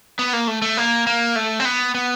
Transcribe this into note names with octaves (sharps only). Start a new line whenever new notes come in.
B3
A#3
A3
A3
A#3
A#3
A3
C4
B3
B3